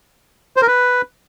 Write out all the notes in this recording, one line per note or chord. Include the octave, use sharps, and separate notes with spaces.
C5
A#4
B4